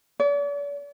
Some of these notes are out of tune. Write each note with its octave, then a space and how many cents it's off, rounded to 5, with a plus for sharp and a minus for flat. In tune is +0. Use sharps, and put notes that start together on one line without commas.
D5 -45